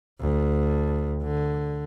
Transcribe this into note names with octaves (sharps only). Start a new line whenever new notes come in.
D2
D3